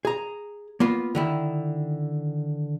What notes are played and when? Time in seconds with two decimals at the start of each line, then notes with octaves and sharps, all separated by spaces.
0.05 G#4 A#5
0.80 A#3 B3 F4
1.15 D3 D#3 E4